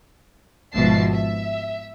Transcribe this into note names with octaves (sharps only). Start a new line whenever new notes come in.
G#1 B2 F3 E5 A5 C7
E5